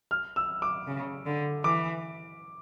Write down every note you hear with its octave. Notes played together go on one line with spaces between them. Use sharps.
F6
E6
D6
C#3
D3
E3 D6